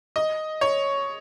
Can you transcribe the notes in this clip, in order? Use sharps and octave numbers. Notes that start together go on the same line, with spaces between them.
D#5
C#5